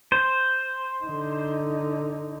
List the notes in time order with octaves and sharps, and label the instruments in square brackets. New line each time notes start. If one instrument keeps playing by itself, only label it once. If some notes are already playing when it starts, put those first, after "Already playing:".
[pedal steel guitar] C5
[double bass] D3 D#4